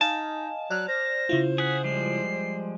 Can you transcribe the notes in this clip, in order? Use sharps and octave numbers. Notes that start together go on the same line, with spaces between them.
D#4 D#5 F5 G#5 A5
F#3 D5 F6 F#6
C5 A#6
C#3 E4 F4
G#4 F#5 B6
F3 G3 G#3 C7